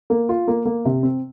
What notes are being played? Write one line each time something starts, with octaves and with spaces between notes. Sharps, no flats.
A#3
F4
A#3
A#3
C3
C4